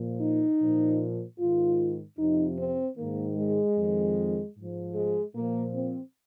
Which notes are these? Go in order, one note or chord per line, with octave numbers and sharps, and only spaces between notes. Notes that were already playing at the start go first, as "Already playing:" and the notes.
Already playing: A#2 F3
D#4
A#2 F3
G#2 D#3 F4
F2 C3 F3 D#4
C4
G#2 D#3 A#3
G#3
F2 D#3
G#2 F3
G#3
A#2 F3 A#3
C4